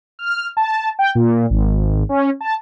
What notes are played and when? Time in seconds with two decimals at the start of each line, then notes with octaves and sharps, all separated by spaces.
0.19 F6
0.57 A5
0.99 G5
1.15 A#2
1.50 G#1
2.09 C#4
2.41 A5